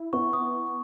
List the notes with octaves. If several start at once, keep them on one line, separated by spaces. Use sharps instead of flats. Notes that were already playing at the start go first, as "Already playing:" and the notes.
Already playing: E4
B3 C#6
D#6